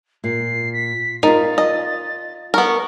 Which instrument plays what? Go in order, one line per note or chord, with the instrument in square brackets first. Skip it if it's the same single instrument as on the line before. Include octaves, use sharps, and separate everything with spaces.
[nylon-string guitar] A#2 [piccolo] C7
[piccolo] B6
[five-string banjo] D#4 [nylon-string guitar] F4 A#4 [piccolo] A6
[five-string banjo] D#5
[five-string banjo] B3 A#4 [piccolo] C#6